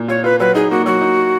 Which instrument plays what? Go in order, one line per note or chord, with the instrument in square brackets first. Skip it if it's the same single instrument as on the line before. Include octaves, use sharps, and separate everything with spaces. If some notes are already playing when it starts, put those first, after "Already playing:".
Already playing: [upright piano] A#2
[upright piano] F4 [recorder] C#5
[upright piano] F4 [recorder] B4
[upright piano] F#3 [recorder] B4
[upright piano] D#4 [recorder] G#4
[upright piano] A#3 [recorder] F#4
[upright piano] F#3 [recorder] F#4
[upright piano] D#4